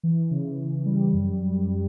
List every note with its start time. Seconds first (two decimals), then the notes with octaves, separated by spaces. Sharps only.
0.03 E3
0.31 C#3
0.59 C#3
0.86 G3
1.13 F#2
1.41 F#2